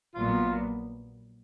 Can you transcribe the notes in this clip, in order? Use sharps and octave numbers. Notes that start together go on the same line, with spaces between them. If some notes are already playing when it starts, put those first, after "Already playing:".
A#1 A#2 F#3 B3 F4